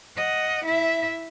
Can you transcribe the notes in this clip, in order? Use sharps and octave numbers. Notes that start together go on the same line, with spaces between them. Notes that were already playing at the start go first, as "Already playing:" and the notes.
D#5 F#5
E4 E5